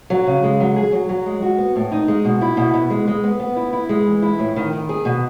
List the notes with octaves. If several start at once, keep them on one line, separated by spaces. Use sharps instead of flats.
F#3
C#3
G#3
F#3
G#4
F#3
F#3
G#3
F#4
B3
A2
D#4
G#3
B2
E4
B2
B2
G#3
G#3
B3
B3
E4
E4
G#3
E3
E4
A2
D#3
D#3
G#4
B2